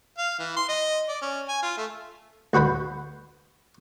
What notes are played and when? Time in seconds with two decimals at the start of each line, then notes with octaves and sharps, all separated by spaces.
0.18 F5
0.39 E3
0.57 C6
0.69 D#5
1.08 D5
1.22 C#4
1.48 G#5
1.63 F4
1.77 A3
2.53 D2 F#4 B4 C5 B5